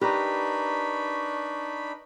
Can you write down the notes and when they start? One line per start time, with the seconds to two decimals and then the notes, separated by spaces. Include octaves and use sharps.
0.01 D4 D#4 G4 A#4 B4 A#5 B5 C#6